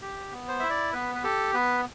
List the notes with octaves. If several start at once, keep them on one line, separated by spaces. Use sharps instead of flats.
G4
B3
C5
E4 E5
D5
B3 B4
B4
G4 A4
B3 B4